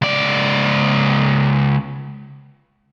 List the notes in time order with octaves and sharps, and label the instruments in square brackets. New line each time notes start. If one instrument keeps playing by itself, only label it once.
[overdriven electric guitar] C#2 D5